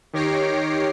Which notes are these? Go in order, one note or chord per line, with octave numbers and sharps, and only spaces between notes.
D#3 G4 C#5 A#6 C7 D7